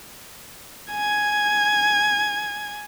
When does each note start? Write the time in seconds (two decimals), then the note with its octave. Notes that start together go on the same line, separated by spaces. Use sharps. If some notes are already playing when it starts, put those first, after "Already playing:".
0.91 G#5 G#6